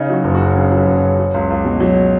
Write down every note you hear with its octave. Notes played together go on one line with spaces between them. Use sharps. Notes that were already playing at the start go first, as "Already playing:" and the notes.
Already playing: C#3 D#4
F#3 F#4
F#1
F#4
F#2
C#3 G#4
F#3 B4
F#1
C#5
F#2
F#3
C#2
C#2
B2
F#3